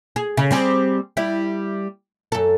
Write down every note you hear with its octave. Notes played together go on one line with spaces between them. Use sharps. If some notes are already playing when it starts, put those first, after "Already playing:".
G#4
C#3
G3 C4 G#4
G3 E4
F#2 A4